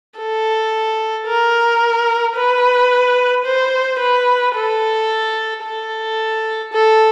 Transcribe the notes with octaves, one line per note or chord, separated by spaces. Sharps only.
A4
A#4
B4
C5
B4
A4
A4
A4